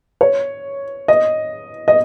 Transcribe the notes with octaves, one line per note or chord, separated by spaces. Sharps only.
C#5
D#5
D#5